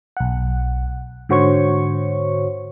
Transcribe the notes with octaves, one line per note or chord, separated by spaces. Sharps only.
B1 F#5
G#2 D3 F#4 C5 C#5 C#6